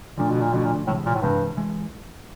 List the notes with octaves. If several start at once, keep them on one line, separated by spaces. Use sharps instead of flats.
A#2 D3 F3 A3 D4
B2
A#2
B2 D3 F3 A3 D4
A#2
A2 C3 E3 G#3
A#2
A2
G2 C3 E3 G#3
E3 G#3